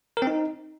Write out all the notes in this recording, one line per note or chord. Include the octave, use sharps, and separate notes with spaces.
A#4
C4
D#4